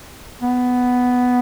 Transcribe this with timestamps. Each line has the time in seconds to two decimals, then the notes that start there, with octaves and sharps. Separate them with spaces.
0.42 B3